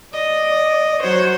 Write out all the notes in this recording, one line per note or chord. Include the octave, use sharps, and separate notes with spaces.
D5 D#5
F#3 F#4 C5 C#5